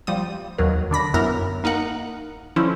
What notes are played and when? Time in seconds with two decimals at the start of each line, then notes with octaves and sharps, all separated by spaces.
0.07 F3 G3 D#6
0.58 D#2 F#3 A#4
0.91 D3 D4 B5 A#6
1.14 F#2 B3 E4 A#4 A#5
1.64 A#3 D#4 A#4 F#5
2.56 D3 F3 C#4 E4